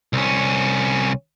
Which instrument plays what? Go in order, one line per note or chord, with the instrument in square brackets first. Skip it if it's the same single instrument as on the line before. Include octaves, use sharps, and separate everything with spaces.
[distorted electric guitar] C2 C#4